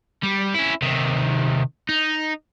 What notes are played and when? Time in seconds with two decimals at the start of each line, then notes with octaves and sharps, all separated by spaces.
0.23 G3
0.55 C#4 E4
0.82 C3 D#3
1.89 D#4